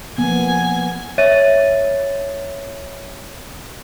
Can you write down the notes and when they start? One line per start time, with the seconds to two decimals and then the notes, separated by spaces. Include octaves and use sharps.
0.18 F3 A#3 B3 G#5
1.18 C#5 E5 A6 D#7